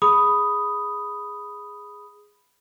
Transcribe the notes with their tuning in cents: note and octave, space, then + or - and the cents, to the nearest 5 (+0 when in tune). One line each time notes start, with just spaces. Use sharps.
G#4 +0 B5 +0 D#6 +0